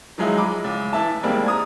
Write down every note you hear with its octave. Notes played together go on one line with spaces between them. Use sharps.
D#3 F3 F#3 G#3 D#4 E4
B5 D6
C#2
E3 E5 A5
D#2 G3 G#3 A#3 C4
A#5 D#6 G#6